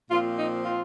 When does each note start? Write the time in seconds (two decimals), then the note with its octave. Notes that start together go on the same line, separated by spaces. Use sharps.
0.10 A#2 F3 C4 F4
0.38 D#4
0.65 F4